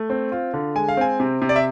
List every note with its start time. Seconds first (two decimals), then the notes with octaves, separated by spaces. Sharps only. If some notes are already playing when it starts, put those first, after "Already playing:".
Already playing: A3
0.10 C4
0.32 F4
0.54 D3
0.76 G#3 G#5
0.89 F5
0.97 C4 G#5
1.20 C3
1.42 C3
1.49 D5
1.56 E5